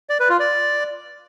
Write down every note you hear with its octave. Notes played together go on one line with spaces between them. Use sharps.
D5
B4
F4
D5